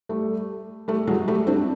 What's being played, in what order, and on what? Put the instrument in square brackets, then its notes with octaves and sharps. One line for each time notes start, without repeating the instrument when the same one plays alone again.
[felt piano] G3 A3
G3 A3
F#3 G#3
G3 A3
C4 D4